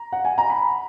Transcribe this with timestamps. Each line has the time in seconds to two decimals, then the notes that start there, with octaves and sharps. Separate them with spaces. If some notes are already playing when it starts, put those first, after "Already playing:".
Already playing: A#5
0.13 F#5
0.25 G#5
0.38 A#5
0.50 B5